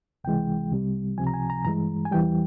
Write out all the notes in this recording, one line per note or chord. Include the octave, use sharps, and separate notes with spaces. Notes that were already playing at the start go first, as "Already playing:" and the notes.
C#2 C3 E3 G#3 G5
C2 C3 G3
C#2 C3 F3 G#5
A#5
G#5
A#5
G2 E3 G#3 A#5
G#5
E2 E3 G3 G5